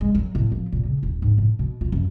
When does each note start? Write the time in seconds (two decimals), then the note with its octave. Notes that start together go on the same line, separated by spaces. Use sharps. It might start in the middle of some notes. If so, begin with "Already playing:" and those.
0.01 G#3
0.15 F#3
0.35 A2
0.52 F3
0.72 A#2
0.85 C#3
1.03 D#1
1.22 G#2
1.38 A2
1.59 B2
1.81 F4
1.92 F#2